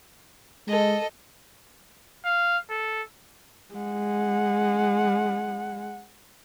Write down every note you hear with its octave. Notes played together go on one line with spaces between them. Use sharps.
G#3 A4 D#5
F5
A4
G#3 F#5